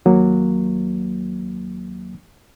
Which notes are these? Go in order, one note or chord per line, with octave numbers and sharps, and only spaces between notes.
D#2 F#3 A#3